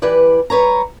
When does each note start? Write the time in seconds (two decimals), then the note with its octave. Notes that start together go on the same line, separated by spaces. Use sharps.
0.02 E3 G4 B4 D5
0.50 G3 B4 C#5 A#5